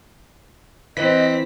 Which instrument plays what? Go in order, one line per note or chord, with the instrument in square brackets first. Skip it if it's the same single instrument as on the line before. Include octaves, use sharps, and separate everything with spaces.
[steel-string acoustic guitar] E3 [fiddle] C4 [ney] D#5 [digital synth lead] B6